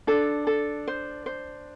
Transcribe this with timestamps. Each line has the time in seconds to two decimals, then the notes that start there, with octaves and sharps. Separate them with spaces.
0.07 D4 A4
0.47 A4
0.87 C5
1.26 C5